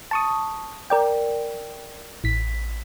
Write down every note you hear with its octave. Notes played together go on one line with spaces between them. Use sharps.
A5 C#6 D#6
A#4 D5 G5
A1 B6